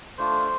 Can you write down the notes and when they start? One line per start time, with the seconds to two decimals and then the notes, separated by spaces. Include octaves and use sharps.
0.18 A3 D4 F4 C5